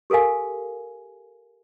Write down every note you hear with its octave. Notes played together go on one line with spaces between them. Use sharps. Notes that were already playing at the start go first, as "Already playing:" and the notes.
G4 A4 A#4 F5 G#5